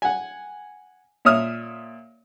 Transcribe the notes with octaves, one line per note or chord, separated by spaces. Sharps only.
F#5 G#5
A#2 C#5 E5 D#6 F6